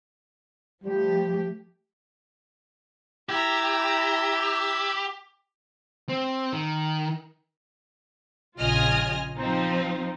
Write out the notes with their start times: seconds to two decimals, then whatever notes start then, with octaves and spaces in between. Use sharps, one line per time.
0.84 F3 G3 A3 G4
3.29 E4 G4 A#5 B5 E6 G#6
6.09 C4
6.53 D#3
8.58 A#1 C#3 F4 D#5 G#5 F6
9.38 F3 C4 D#4